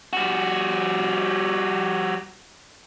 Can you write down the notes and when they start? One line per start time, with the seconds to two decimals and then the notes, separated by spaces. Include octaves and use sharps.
0.13 G3 F#4